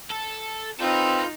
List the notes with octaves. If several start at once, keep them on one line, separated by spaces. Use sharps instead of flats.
A4
C4 D#4 F4 A4 B4 G6